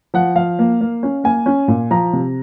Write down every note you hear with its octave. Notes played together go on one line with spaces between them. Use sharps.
F3 F#5
F3 F5
A#3
A#3
C#4
A#3 G#5
C#4
A#2
F3 A#5
C3